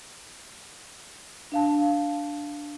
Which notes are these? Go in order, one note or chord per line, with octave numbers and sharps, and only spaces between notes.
D4 F5 A5